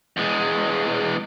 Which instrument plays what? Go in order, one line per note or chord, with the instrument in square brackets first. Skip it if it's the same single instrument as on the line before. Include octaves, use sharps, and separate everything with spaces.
[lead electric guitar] E2 G#3